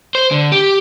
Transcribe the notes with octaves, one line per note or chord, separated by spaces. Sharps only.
C5
D3
G4